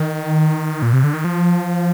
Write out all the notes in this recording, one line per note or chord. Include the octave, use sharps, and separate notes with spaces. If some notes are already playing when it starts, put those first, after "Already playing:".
Already playing: D#3
A#2
C3
D3
D#3
F3